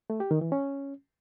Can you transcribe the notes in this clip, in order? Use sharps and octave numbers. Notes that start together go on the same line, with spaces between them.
A3
G4
D#3
E3
C#4